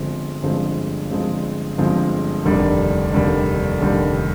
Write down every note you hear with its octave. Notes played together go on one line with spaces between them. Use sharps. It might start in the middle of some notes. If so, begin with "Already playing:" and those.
Already playing: G1 G2 F3 G#3 C4
G1 G2 F3 G#3 C4
G1 G2 F3 G#3 C4
G1 G2 F3 G#3 C4
F1 D#2 D3 G3 D4
F1 D#2 D3 G3 D4
F1 D#2 D3 G3 D4